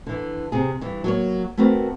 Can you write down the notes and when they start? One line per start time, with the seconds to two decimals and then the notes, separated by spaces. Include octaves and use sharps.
0.07 D3 E3
0.52 C3 G#4
0.81 G2 E3
1.04 F#3 A#3 C#5
1.57 A3 B3 C4 F#4 A#4